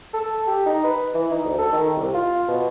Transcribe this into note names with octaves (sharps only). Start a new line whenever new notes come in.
A4
G4
D#4
B4
E3
D#4
D2
A4
D#3
C2
F4
B2